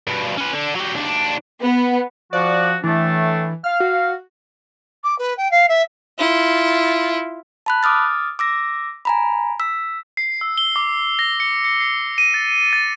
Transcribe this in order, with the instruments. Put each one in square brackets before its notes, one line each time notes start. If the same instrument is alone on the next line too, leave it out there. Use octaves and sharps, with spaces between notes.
[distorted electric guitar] G2 B2
C#4 B4
D3
F#3 G4
D#2 D4
[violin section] B3
[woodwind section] F3 F#4 [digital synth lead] D5
[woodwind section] A2 A3 D4 [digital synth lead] E3
[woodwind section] F5 [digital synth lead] F6
[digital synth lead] F#4
[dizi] D6
B4
G5
F5
E5
[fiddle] E4 F4
[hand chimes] A5 B5 F#6
D6 D#6 F6 A6
D6 E6 A#6
G#5 A#5 B5
E6 B6
[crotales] C7
E6
G7
D6
A#6
C#7
C#7
C7
D#7
A6
A6